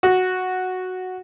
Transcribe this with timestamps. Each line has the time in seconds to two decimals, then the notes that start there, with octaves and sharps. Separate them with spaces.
0.03 F#4